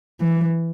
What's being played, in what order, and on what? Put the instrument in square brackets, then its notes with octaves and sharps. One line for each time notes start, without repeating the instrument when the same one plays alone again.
[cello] E3